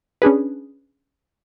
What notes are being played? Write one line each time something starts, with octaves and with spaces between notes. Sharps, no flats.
C#4 D4 G#4 B4